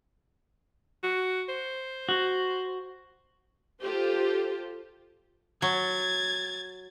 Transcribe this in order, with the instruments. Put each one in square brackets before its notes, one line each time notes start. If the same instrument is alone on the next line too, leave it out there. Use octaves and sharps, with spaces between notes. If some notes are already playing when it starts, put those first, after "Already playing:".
[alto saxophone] F#4
C5
[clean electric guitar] F#4
[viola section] F4 G4 A4 C5
[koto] F#3 [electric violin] G#6 A6